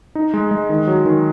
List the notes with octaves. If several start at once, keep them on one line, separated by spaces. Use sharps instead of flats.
D#4
G#3
G#3
D#3
F#3
D#3